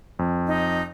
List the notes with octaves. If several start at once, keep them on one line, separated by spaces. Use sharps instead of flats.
F2
D#4